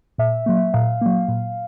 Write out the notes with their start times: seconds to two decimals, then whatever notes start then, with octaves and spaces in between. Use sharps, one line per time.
0.18 A#2 E5
0.46 F#3 A#3
0.74 A#2 F5
1.01 F#3 A#3
1.29 A#2